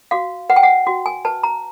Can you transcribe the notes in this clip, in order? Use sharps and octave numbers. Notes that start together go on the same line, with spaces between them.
F#4 F5
B4 F#5
G5
F#5
F#4
G#5
B4 A5
A#5